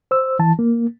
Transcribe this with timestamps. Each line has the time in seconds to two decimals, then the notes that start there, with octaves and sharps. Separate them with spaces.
0.11 C5 E6
0.39 E3 A5
0.59 A#3